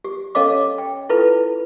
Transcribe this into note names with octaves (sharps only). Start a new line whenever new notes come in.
G4
C#4 A4 C#5 D#5 F5 D6
G5
E4 F4 A4 B4